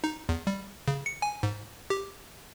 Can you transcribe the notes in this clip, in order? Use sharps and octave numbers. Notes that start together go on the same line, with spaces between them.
D#4
E2
G3
C#3
C#7
G#5
G#2
G4